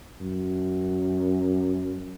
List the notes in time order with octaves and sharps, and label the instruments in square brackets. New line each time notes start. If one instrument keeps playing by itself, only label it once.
[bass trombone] F#2